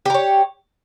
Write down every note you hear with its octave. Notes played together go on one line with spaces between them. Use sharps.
G4 A#4 C#5